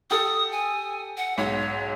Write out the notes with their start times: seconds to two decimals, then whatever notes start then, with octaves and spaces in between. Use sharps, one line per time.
0.11 G4 A4 D#6
0.52 G#5
1.17 F#5
1.38 B1 G#2 C#5